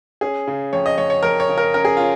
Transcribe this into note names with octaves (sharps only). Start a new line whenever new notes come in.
C#4 G#4
C#3
F2 C#5
D#5
F2 C#5
C#5
F2 A#4
C#5
C#3
A#4
C#4 A#4
G#4
C#4 F4